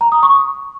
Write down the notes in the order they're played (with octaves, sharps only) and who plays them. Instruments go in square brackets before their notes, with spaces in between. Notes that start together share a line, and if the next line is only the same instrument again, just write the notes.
[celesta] A#5
D#6
C#6